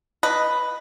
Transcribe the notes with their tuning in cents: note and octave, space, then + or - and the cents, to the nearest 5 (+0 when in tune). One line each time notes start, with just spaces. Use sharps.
B4 +0 D#5 +0